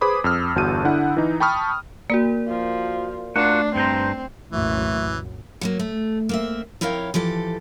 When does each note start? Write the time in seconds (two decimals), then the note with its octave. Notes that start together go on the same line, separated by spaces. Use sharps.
0.01 G#4 B4 C5 B5 D6 D#6
0.24 F2 E6 F6
0.56 G1 E2 F#4 A5 G6 D#7
0.84 D3 D4 E4 F#5
1.17 E3 D#4
1.40 G5 A5 B5 C#6 D#6 F6
2.10 A#3 F#4 A#4 D5
2.48 F3
3.36 A3 D4 F4 F#4 F#5 C7
3.75 G2 C4 C5 A#5
4.52 C2 F#2 A#2 E3 A3
5.61 F#3 A3 A#3
5.79 A3
6.29 A#3 C4 E5
6.81 F2 E4 A#4 C#5 F5 G5
7.14 E3 F3 G4 A4